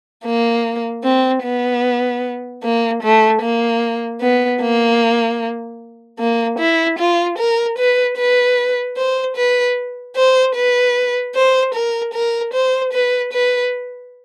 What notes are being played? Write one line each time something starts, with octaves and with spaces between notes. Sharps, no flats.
A#3
C4
B3
A#3
A3
A#3
B3
A#3
A#3
E4
F4
A#4
B4
B4
C5
B4
C5
B4
C5
A#4
A#4
C5
B4
B4